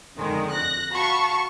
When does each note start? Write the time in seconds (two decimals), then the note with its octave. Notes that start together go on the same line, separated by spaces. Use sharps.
0.18 F2 D3 D#3 G#3
0.52 F#6 A#6
0.92 F#4 F5 A5 B5 C#6